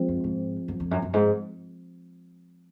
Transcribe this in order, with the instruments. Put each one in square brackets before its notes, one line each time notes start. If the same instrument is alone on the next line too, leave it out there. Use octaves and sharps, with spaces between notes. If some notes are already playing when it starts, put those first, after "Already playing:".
Already playing: [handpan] F3 G#3 C4
[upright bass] F#2
G#2
F#2
F2
F#2
F#2
G#2